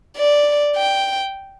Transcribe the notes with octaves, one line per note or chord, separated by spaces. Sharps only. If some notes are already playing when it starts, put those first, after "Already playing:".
D5
G5